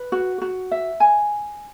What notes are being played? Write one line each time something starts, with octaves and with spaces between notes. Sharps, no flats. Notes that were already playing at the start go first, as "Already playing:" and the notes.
Already playing: B4
F#4
F#4
E5
G#5